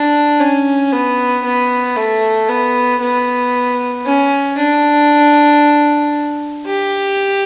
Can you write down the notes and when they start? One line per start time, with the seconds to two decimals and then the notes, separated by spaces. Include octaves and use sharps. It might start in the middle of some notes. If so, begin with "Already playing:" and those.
Already playing: D4
0.40 C#4
0.92 B3
1.44 B3
1.96 A3
2.49 B3
3.01 B3
4.06 C#4
4.58 D4
6.66 G4